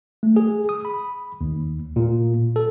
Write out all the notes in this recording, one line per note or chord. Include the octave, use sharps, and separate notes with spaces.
A3
G#4
D#6
B5
D#2
A#2
A4